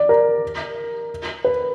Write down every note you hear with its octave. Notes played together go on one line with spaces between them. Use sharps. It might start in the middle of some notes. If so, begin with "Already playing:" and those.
Already playing: D5
A#4
B4